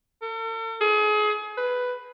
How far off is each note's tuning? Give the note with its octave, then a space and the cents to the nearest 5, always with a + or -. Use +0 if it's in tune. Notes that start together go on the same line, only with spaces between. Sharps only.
A4 +45
G#4 +30
B4 +5